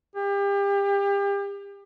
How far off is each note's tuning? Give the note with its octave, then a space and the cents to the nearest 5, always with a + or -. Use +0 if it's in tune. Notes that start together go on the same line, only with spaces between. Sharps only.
G4 +35